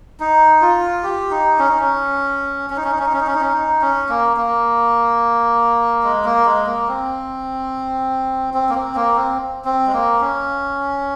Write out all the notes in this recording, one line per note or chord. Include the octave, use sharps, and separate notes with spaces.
D#4
F4
G4
D#4
C#4
D#4
C#4
C#4
D#4
C#4
D#4
C#4
D#4
C#4
D#4
C#4
D#4
C#4
D#4
C#4
A#3
A#3
G#3
A#3
G#3
A#3
C4
C4
A#3
C4
A#3
C4
C4
G#3
A#3
C#4